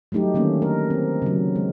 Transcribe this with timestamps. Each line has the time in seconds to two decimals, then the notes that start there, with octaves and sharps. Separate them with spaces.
0.12 F#3 G3 A3 D#4 G4
0.34 D3 D#3 A3 A#3 C#4
0.62 A#4
0.90 C4
1.22 C#3 F#3
1.56 G#3